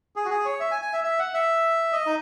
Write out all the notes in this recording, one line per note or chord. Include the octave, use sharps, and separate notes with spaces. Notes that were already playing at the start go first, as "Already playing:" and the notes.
G#4
F#4
G#4
C#5
E5
G#5
G#5
E5
E5
F#5
E5
D#5
D#4